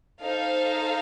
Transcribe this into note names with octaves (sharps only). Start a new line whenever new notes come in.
D#4 A4 C5 F5